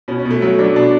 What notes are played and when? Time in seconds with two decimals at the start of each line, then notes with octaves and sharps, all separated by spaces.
0.08 B2 C#4
0.20 C#4
0.26 B2
0.31 A3
0.42 F#3 C#4
0.59 F#3 D4
0.76 B2 D4